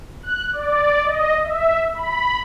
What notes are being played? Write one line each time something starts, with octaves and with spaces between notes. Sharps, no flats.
F#6
D5
D#5
E5
B5